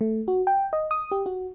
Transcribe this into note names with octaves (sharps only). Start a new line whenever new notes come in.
A3
F#4
G5
D#5
D#6
G4
F#4